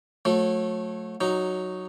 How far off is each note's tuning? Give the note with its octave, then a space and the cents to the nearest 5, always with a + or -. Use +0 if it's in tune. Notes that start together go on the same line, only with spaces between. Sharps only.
F#3 -35 A3 +0
F#3 +0 D#4 +0